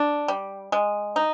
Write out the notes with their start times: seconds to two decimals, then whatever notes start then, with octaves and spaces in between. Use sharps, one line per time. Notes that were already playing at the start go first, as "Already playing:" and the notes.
Already playing: D4
0.28 G3
0.72 G#3
1.16 D#4